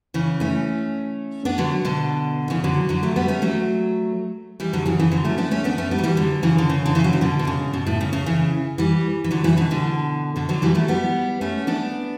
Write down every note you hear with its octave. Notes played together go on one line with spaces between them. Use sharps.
C#3 E3
A3 C#4
B3 D4
D3 F#3
B2 D3
C#3 E3
D3 F#3
D3 F#3
F#3 A3
G3 B3
A3 C#4
F#3 A3
E3 G3
D3 F#3
C#3 E3
C#3 E3
D3 F#3
A3 C#4
B3 D4
A3 C#4
B3 D4
A3 C#4
G3 B3
F#3
E3 G3
D3 F#3
C#3 E3
D3
C#3
D3
C#3 E3
F#3
E3
B2 D3
B2
C#3
B2
A2
C#3
C#3
C#3 E3
E3 G3
E3
D3 F#3
C#3 E3
B2 D3
B2 D3
B2 D3
D3 F#3
E3 G3
F#3 A3
G3 B3
A3 C#4
B3 D4